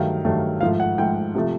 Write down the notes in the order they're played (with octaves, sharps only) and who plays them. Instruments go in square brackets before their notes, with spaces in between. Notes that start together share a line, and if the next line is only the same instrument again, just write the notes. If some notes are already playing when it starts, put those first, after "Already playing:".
Already playing: [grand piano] G2 D#3 F#3 A3 F5
G2 D#3 F#3 A3
G#2 F3 A3 F5
F#5
G#2 F3 A3 G5
C3 F3 A3